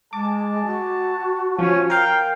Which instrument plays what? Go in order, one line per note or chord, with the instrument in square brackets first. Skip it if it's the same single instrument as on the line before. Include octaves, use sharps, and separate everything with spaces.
[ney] G#3 [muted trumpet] A5 [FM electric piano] D6
[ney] F#4
[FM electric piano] F3 [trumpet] C#4
[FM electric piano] A#4 F5 [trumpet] G5